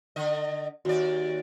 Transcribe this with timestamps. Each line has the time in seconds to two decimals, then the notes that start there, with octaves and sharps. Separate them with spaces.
0.16 D3 D#5
0.85 D#2 F#4 D5